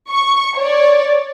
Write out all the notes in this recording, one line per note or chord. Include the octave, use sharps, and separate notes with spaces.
C#6
C#5 D5